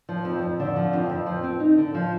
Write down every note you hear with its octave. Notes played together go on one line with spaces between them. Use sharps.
F3
F2
F2
D3
F3
F2
F2
F3
C4
D#4
D3
F3